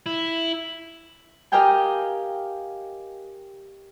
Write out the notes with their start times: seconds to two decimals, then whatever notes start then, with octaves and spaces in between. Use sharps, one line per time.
0.06 E4
1.52 G4 A#4 D#5 F5 G5 G#5